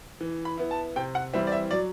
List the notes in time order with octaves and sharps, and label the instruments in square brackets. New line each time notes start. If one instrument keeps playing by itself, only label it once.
[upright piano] E3
B5
B3 E4
A5
C3 G5
F#5
E3 G3 C4 E4 E5
D5
E5
F#3 D5